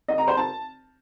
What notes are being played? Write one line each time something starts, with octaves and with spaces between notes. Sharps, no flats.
D#5
A#5
C5
A5